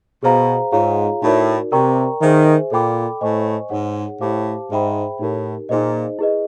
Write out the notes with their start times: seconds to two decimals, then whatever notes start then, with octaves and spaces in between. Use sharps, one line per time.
0.23 B2 G#4 C5 F5 A#5
0.72 G#2 F4 G#4 C#5 F5 A#5
1.23 A2 D#4 F#4 A#4 D5
1.72 C3 A#4 D5 G5 A#5 C#6
2.21 D#3 G#4 C5 E5 G#5
2.71 A#2 A4 D5 G5 B5 D6
3.21 A2 C5 D#5 G#5 C#6
3.70 G#2 D#4 G#4 C#5 F#5
4.20 A2 G4 C5 F5 A5 D6
4.70 G#2 G#4 C5 E5 G5 B5
5.20 A2 D#4 G4 A#4
5.69 A#2 D#4 G#4 C5 D#5
6.19 E4 G#4 B4 D#5